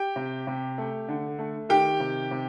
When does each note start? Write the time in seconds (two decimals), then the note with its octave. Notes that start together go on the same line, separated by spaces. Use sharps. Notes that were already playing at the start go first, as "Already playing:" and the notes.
Already playing: G4 G5
0.16 C3
0.47 C3
0.78 A3
1.09 D3
1.39 A3
1.69 D#3 G4 G5
2.00 C3
2.31 C3